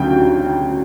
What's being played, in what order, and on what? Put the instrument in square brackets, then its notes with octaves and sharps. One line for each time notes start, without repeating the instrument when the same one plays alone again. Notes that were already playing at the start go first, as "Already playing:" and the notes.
Already playing: [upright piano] D2 C#3 F#3 G5